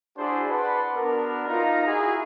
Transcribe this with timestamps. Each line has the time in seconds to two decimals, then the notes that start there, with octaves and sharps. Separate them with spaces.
0.18 D4 E4 F#4 G#4 C5 D5
0.51 B4 D5 F#5 A5 B5 C6
0.95 B3 D4 F#4 A#4
1.48 D#4 F4 A#5
1.87 E4 F#4 G#4